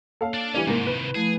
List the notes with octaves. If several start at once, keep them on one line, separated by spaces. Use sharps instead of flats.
A#3 A4 C#5 F5
D4 D5
E3 G3 C#4 D4 E4
G#2 C3 D#3 A#3
B4
F3 A3 E4 G#4